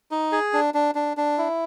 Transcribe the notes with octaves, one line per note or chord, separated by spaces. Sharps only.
D#4
G#4
D4
D4
D4
D4
E4